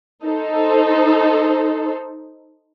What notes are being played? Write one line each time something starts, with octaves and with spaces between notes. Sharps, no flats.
D#4 A4 C5